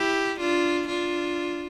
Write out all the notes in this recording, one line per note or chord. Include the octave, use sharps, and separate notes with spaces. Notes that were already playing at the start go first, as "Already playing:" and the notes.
Already playing: E4 G4
D4 F4
D4 F4